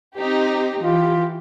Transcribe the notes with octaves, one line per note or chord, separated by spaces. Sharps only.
C4 D#4 G4
E3 F4 G4